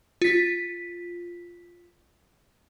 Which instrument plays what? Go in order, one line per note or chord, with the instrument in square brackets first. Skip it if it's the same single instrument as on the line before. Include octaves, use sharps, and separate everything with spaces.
[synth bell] F4 B6